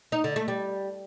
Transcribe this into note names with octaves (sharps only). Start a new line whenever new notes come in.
D#4
D3
A3
G3